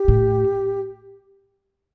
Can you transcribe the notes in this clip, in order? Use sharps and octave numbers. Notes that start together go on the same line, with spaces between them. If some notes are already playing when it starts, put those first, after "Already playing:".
Already playing: G4
A2